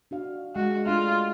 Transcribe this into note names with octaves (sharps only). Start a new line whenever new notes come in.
D4 F#4 F5
G#3 F#4
A3 D4 F4 G#4